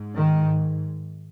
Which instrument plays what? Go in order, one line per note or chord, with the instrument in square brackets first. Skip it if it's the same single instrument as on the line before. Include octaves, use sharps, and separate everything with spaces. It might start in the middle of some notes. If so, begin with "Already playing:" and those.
Already playing: [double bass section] G#2
D#3